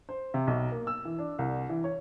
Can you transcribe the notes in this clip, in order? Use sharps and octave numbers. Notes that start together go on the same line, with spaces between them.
C5
C3
B1
A#3
E6
E3
D4
C2
E3
C#5